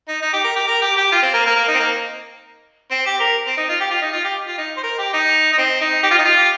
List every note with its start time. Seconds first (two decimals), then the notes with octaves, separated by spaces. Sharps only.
0.08 D#4
0.22 D#4
0.33 G4
0.44 A#4
0.56 G4
0.67 A#4
0.82 G4
0.97 G4
1.12 F4
1.22 C4
1.34 A#3
1.46 A#3
1.56 A#3
1.68 D#4
1.75 C4
1.79 A#3
2.91 C4
3.06 G4
3.20 A#4
3.47 C4
3.57 D#4
3.69 F4
3.80 G4
3.91 F4
4.02 D#4
4.13 F4
4.24 G4
4.47 F4
4.58 D#4
4.77 C5
4.83 A#4
4.98 G4
5.13 D#4
5.52 D#4
5.58 C4
5.81 D#4
6.03 G4
6.11 F4
6.18 D#4
6.25 F4
6.38 G4